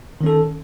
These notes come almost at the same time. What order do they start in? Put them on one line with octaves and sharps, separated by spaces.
D#3 C#4 A4